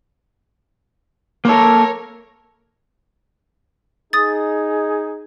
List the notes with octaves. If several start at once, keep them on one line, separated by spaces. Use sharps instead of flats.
A#3 A4 A#4 C#5
D#4 G#4 D#6 A6